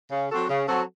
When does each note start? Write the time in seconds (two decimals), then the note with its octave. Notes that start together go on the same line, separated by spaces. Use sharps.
0.11 C#3
0.29 F#3 C4 F#4 A4
0.48 C#3
0.67 F#3 C4 F#4 A4